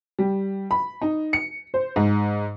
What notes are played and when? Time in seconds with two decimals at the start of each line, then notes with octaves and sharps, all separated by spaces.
0.19 G3
0.71 B5
1.02 D#4
1.33 C#7
1.74 C5
1.96 G#2